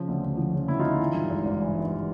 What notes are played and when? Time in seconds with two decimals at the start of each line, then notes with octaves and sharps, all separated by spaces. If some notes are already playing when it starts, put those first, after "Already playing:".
Already playing: C#3 F3
0.08 D2
0.23 D2
0.38 F3
0.54 C#3
0.68 D2 E4
0.79 D2 D#4 F4
1.00 E3
1.14 G2
1.30 G#1
1.45 G#1
1.62 E3
1.77 G2